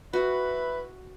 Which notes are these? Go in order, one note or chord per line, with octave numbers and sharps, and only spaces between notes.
E4 F#4 B4